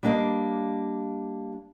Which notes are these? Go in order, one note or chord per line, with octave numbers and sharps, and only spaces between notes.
G3 A#3 D4 D#5 F5